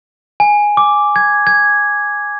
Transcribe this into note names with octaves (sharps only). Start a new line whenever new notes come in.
G#5
D6
G#6
G#6